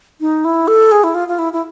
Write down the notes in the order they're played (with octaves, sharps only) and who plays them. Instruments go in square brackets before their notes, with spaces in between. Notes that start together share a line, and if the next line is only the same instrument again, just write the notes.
[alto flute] D#4
E4
A4
G#4
E4
F4
F4
E4
E4